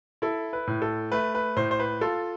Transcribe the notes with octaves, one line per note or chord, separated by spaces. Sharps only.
E4 A4
B4
A2
A4
A3 B4
B4
A2 C5
C5
B4
F4 A4